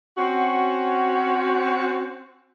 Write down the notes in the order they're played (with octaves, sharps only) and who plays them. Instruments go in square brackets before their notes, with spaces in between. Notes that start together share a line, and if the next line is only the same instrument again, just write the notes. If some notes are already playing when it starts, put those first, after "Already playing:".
[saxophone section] C4 C#4 F#4